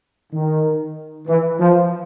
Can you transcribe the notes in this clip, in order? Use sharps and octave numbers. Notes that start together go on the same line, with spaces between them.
D#3
E3
F3